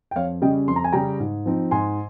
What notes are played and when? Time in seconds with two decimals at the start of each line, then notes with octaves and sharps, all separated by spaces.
0.11 G5
0.16 F2 C#5 F5
0.42 C#3 G3 C#4 D#5 G5
0.68 F2 C6
0.76 A#5
0.84 G#5
0.92 C#3 G3 C#4 G5 A#5
1.20 G#2
1.46 F3 C4 D#4
1.71 G#2 G#5 C6